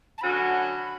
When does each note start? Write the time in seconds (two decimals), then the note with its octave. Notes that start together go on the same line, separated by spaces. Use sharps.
0.18 A5
0.21 D3 F#3 C#4 F#4 B5